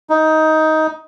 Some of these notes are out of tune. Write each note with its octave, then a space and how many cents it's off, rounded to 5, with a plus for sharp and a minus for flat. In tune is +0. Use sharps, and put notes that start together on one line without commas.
D#4 +15